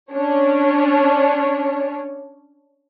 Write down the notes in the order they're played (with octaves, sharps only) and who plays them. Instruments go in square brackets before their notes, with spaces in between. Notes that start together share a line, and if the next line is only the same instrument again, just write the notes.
[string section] C#4 D4 C#5